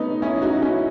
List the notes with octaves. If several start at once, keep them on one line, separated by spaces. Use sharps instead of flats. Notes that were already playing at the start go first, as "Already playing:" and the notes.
Already playing: A3 B3 C#4 D#4
C#4 E4
D#4 F#4
C#4 E4